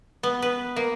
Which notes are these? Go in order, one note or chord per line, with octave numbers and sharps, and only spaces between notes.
B3
B4
A#3